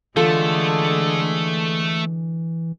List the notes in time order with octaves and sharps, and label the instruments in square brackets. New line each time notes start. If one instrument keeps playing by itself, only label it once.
[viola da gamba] D3 G#3 G#4 [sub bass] E3 [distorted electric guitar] A3 [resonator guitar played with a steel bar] F4 A4